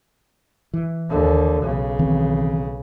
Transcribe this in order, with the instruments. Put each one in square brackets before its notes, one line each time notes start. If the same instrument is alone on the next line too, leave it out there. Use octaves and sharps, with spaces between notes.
[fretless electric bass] E3
[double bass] D#2 D3
B1 C#3
[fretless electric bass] D#3 E3 C4